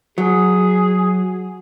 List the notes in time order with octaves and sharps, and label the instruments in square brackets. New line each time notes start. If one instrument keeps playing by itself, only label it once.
[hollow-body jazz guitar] F#3 [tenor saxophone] G#4